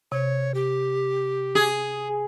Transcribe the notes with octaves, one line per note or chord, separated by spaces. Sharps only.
C3 C#5
G4
G#4